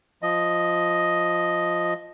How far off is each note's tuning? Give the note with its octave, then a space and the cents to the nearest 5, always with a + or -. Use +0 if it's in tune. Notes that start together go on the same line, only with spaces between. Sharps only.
F3 +0 D#5 +0